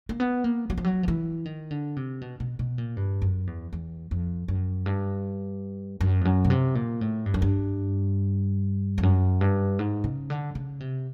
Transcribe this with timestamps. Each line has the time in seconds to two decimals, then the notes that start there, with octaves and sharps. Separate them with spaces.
0.09 A#3
0.20 B3
0.44 A#3
0.70 F#3
0.77 F3
0.85 F#3
1.03 F3
1.08 E3
1.45 D#3
1.71 D3
1.96 C3
2.21 B2
2.40 B2
2.59 B2
2.78 A#2
2.97 G2
3.22 F#2
3.47 E2
3.73 E2
4.11 F2
4.48 F#2
4.86 G2
6.00 F#2
6.21 F2
6.25 F#2
6.44 B2
6.50 C3
6.75 A#2
7.01 A2
7.26 G2
7.34 F#2
7.42 G2
8.98 F2
9.03 F#2
9.41 G2
9.79 G#2
10.04 C#3
10.30 D3
10.55 C#3
10.80 C3